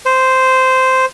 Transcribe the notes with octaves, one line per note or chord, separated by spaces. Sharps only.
C5